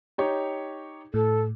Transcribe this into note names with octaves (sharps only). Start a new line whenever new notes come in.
D#4 G4 C#5
A2 A4